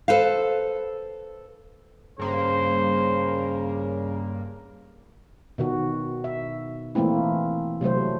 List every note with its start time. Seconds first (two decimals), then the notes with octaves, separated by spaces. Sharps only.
0.08 A4 B4 C5 F5
2.19 G2 C#3 A#3 C5
5.58 B2 D#3 F#4
6.24 E5
6.95 E3 A3 A#3 C4 E4
7.81 C3 F#3 A3 C5